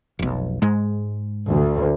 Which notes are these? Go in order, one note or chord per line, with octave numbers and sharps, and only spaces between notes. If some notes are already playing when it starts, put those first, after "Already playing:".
F1 B1
G#2 G#3
D2